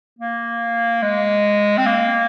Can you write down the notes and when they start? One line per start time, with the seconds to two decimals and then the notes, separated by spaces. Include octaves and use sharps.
0.19 A#3
1.02 G#3
1.78 C4
1.86 A#3